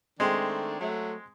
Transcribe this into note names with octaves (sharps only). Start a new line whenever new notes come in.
D#3 G#3 A3 C4 D4
F#3 A3